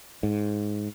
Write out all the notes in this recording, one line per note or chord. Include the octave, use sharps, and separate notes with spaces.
G#2